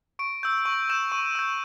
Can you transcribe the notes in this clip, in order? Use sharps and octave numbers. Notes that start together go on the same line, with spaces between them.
C#6 D7
E6 G6
C#6 F#7
E6 G6 E7
C#6 D#7
E6 G6